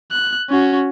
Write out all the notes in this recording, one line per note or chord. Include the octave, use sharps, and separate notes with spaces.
F#6
C#4 F#4